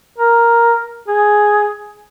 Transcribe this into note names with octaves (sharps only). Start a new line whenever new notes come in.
A#4
G#4